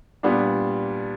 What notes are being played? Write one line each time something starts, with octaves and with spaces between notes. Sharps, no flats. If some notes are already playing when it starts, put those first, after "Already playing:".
A#2 G3 B3 D4